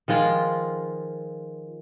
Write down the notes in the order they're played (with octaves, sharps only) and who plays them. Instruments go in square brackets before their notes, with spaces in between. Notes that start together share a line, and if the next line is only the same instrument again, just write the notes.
[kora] D#3 F3 G#3 F4